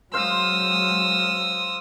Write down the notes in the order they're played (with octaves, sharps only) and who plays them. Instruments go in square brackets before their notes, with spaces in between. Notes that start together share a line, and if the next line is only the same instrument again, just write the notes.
[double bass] F#3 G#3 [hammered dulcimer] C5 F5 [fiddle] D#6 E6